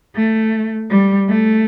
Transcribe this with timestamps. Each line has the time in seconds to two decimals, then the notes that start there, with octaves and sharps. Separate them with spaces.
0.16 A3
0.90 G3
1.29 A3